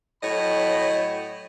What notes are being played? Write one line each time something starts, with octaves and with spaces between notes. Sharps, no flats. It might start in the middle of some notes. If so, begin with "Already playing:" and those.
A2 F#3 C#5 D#5 G5 B5